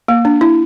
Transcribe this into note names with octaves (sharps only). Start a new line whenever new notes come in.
A#3
D4
E4